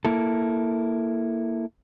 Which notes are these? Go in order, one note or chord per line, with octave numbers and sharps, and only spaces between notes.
A#3 E4 A4